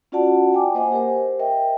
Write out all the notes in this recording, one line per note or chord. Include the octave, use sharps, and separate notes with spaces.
C#4 F4 F#4 D5 F#5 A5
G5 G#5 D6
A#3 C5 D#5 F#5 G#5
G4 A#4 C5
A#4 D#5 E5 G5